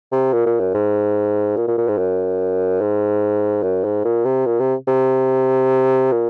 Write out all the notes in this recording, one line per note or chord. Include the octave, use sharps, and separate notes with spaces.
C3
A#2
A#2
F#2
G#2
A#2
A#2
A#2
G#2
F#2
G#2
F#2
G#2
A#2
C3
A#2
C3
C3
A#2